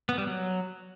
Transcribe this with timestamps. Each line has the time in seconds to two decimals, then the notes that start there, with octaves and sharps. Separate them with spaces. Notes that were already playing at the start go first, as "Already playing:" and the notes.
0.09 B3
0.18 G3
0.27 F#3